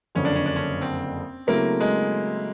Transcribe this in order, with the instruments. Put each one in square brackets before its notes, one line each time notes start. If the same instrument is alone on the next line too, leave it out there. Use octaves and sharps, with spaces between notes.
[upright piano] F#1 F2 D3 [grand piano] C#4
[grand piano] D4
C#4
D4
C#4
C4
[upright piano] C#3 F#3 A3 C4 E4 [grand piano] A#3
[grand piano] G#3